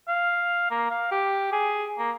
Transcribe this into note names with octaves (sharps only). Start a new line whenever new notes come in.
F5
A#3
F5
G4
G#4
A#3